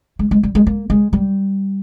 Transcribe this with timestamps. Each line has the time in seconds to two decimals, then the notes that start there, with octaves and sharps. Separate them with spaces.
0.19 G#3
0.31 G#3
0.43 G3
0.55 G#3
0.67 A#3
0.90 G#3
1.13 G3